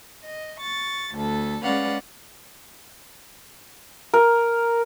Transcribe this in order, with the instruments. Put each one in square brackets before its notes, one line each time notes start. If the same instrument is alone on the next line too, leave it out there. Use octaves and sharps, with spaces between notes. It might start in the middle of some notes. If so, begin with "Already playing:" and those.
[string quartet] D#5
C#6 A6
D2 A4
G#3 C#4 B4 D5 F5 F#5
[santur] A#4